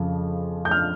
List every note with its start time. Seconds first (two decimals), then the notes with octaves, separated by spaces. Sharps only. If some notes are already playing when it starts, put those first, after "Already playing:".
Already playing: F2 C#3 F3
0.65 G6
0.71 F6